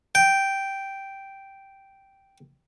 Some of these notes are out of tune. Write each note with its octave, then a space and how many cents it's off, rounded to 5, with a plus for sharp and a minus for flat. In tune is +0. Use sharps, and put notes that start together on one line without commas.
G5 -5